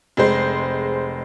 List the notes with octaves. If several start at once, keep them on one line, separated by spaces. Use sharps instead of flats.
F1 G#3 C5